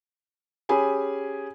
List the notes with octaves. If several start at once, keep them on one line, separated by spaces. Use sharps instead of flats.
C#4 G4 G#4 G#5 B5